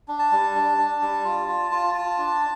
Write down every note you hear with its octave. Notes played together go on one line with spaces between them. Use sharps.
D4
A5
G3
D4
D4
G3
F4
F4
F4
F4 A5
D4